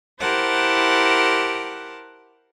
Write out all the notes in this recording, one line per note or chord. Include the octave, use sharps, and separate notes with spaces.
E4 G4 A#4 C5 F#5 A5